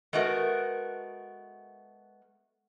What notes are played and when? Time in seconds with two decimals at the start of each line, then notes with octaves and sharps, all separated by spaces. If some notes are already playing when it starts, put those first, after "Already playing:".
0.13 G#3 A3 B3 F#4 A#4